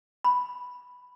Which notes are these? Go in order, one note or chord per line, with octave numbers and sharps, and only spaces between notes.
B5